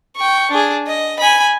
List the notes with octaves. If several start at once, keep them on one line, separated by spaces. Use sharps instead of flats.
G5 C#6
D4 G#4
D#5
G#5 B5